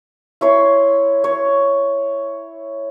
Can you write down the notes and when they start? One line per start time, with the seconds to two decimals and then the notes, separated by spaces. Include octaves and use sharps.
0.41 E4 C#5 C6
1.24 C#5